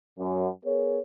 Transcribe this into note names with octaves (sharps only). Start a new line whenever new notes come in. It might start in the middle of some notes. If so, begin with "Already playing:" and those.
F#2
B3 G#4 A#4 C#5